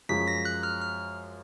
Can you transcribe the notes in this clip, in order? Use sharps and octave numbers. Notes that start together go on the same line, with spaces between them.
F#2 F3 G#3 B6
A#6
F#6
F6
F6